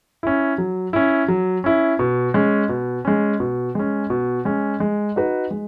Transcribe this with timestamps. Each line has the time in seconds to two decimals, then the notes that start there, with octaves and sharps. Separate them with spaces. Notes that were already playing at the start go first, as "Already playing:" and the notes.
0.23 C#4 E4
0.58 F#3
0.93 C#4 E4
1.28 F#3
1.64 C#4 E4
1.99 B2
2.34 G#3 C#4
2.69 B2
3.05 G#3 C#4
3.40 B2
3.75 G#3 C#4
4.10 B2
4.45 G#3 C#4
4.80 G#3
5.16 D#4 F#4 B4
5.51 G#3